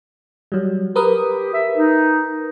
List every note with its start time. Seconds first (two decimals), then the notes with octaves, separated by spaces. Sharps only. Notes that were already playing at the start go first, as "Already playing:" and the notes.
0.52 F#3 G3
0.96 G4 A#4 B4 D#6
1.54 E5
1.75 D#4